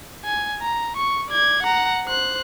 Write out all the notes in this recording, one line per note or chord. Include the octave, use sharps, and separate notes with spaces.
G#5
A#5
C#6
D5 G#6
F#5 A#5
C5 F#6